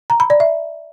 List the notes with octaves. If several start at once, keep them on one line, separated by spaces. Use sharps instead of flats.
A#5
B5
D5
E5